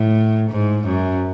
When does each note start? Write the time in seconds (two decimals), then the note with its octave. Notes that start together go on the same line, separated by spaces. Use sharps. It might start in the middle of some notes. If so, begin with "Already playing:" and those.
Already playing: A2
0.51 G#2
0.85 F#2